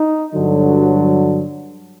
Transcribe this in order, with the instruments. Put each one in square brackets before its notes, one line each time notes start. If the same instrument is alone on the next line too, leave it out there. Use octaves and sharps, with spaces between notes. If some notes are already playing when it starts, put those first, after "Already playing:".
Already playing: [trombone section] D#4
G2 D3 F#3